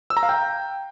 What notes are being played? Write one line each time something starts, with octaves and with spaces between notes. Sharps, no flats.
E6
A#5
F5
G5